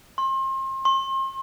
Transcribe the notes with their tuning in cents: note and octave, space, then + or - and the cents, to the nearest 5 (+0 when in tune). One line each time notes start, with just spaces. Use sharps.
C6 +35
C6 +40